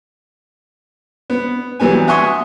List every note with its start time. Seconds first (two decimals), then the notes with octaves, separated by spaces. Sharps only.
1.30 B3
1.80 E3 F#3 G3 B3 G#5
2.08 E5 F#5 G#5 C6 C#6 D#6